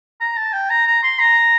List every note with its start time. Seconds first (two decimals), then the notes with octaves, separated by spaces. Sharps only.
0.21 A#5
0.37 A5
0.54 G5
0.70 A#5
0.87 A#5
1.03 C6
1.20 A#5